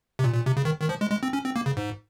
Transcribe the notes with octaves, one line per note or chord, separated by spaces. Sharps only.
C3
A#2
A#2
C3
C#3
D#3
D#3
F3
G#3
G#3
C4
C#4
C4
A#3
C#3
G#2